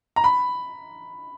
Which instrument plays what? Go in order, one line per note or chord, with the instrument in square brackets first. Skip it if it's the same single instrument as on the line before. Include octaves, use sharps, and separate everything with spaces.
[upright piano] A#5
B5